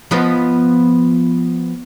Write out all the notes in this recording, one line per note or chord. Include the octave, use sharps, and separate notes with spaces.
F3 B3 D#5